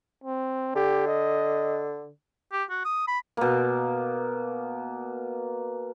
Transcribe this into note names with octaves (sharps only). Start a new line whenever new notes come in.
C4
D3 G4
D#5
G4
F#4
D#6
B5
B2 A#3